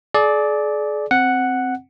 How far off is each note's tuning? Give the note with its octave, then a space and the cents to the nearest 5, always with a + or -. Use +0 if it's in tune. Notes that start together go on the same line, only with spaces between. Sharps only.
G#4 +40 D5 +0
C4 +0 F#5 +0